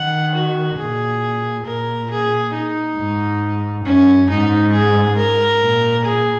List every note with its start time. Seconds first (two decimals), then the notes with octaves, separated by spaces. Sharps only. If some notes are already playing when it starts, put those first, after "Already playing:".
Already playing: D#3 F#5
0.35 F#4
0.78 A#2 G#4
1.66 A#2 A#4
2.10 G#4
2.54 D#4
2.97 G#2
3.85 F#2 C#4
4.29 G#2 D#4
4.73 G#4
5.16 A#4
5.61 A#2
6.04 G#4